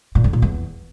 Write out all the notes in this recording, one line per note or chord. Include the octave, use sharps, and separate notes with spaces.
A#2
F2
A#2
E2